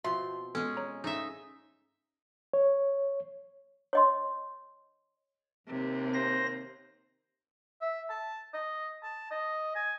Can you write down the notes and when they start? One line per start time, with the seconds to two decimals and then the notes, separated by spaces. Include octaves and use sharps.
0.04 B2 F3 C4 E5 C6
0.55 G#3 B3 C#4 A4
0.77 C#5 A#5
1.04 G#2 C#3 A3 D#4 E5
2.53 C#5
3.93 C#5 D#5 C6
5.67 D#2 C3
6.14 C5 A#6
7.82 E5
8.10 A5
8.54 D#5
9.03 A5
9.31 D#5
9.75 G#5